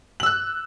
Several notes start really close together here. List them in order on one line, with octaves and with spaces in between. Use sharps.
F#7 E6 F#6